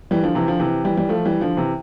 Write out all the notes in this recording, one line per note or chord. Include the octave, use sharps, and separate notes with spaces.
E3 G3
D3 F3
C3 E3
D3 F3
C3 E3
E3 G3
G3
F3 A3
E3 G3
D3 F3
C3 E3